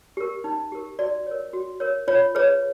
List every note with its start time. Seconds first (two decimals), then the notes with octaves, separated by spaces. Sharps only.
0.17 G4 A#4
0.44 D#4
0.72 G4 A#4
0.99 F#4 D5
1.27 A#4 C#5
1.53 F#4
1.80 A#4 C#5
2.08 F4 C#5
2.35 G#4 B4 C#5